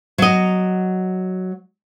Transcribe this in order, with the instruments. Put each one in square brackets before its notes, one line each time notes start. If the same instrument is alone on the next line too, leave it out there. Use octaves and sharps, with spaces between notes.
[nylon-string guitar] F#3 D#5